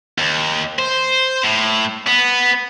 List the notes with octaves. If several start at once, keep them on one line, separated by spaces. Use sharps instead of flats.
D#2
C5
A2
B3